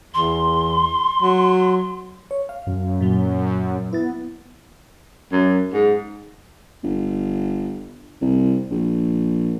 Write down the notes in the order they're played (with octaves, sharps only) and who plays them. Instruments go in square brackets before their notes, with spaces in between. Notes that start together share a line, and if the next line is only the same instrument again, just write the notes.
[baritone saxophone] E2 [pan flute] C6
[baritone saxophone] F#3
[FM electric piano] C#5
F5
[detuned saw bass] F#2
[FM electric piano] A#2 F#3
[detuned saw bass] B3 [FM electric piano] E4 A6
[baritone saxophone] F#2
G#2
[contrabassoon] G1
C2
A#1